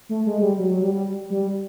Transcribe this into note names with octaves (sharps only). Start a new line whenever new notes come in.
A3
G#3
G3
F#3
F#3
G3
G3
G3